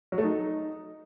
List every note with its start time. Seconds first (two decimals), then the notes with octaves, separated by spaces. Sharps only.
0.12 F#3
0.18 A3
0.24 D#4